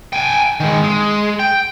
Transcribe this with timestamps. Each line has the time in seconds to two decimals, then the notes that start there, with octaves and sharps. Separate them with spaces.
0.13 G5 G#5
0.60 D#3 G#3
0.83 G#3
1.39 G5